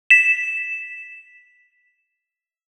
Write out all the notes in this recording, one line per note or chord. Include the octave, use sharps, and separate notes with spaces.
B6 E7